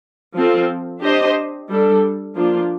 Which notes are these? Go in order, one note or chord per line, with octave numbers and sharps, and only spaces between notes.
F3 C4 F4 A4
D4 G4 C5 D#5
G3 D4 A4
F3 A#3 D4 F4